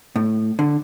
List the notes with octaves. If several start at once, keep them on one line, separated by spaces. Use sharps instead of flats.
A2
D3